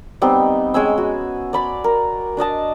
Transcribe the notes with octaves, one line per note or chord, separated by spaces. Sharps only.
G3 B3 C4 D#4
G#3 C#4 G#5 E6
F#4
D5 B5 C6
A#4
D4 D5 D#5 A5